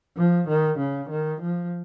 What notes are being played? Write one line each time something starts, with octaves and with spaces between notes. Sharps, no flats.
F3
D#3
C#3
D#3
F3